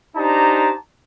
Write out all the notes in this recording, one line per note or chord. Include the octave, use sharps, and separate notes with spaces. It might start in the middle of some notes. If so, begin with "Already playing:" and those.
D4 D#4 G4 C5 A5 A#5